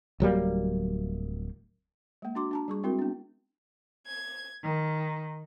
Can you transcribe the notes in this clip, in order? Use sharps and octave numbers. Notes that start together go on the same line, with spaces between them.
D1 F#3 G3 A#3
G#3 A#3
D4 F#4 C6 D6
D4 A5 A#5
G3 G#4 C#6
G#3 C4 E4 F#4 A#4
B3 D4
G#6
D#3